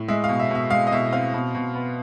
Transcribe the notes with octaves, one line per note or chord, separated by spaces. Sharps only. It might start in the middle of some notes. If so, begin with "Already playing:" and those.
Already playing: A2
G#3 E5
F5
B2
E5
B2 E5
G#3 F5
D#5
B2 E5
C4 F5
B2
B2
B3